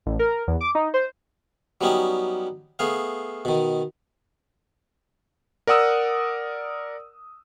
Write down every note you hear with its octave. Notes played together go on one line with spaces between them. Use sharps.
A1
A#4
E2
D6
D#4
C5
F#3 G3 B3 C#4 D#4 G4
A3 B3 G#4 F5
B2 D#3
A#4 D5 F#5 D#6 E6